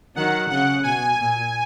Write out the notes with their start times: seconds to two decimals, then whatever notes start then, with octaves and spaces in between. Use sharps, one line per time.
0.15 D#3 F#3 F#5
0.50 C#3 F#5
0.83 B2 G#5
1.18 A#2